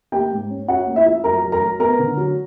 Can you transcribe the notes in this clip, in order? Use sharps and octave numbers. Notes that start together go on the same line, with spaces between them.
A#3 G4 G5
G#2
C#4
C#4 F#4 F#5
A#3
E4 E5
F3
F#2 A#4 A#5
F#2
A#4 A#5
F#3
B3 A#4 A#5
D3
F#3